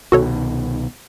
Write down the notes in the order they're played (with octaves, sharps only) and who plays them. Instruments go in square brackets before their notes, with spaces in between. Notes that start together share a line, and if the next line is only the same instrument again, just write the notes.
[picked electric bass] C2 B2 D#3 [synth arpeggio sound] F#4 A4 C#5